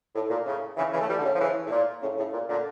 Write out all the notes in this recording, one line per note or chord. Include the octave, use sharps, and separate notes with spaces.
A2
A#2
A2 C#3
C#3 E3
C#3 E3
A3
E3 G3
D3
A2 C#3
F3
C#3 E3
A2
A#2
A2 C#3
A2 C#3
A#2
A#2 D3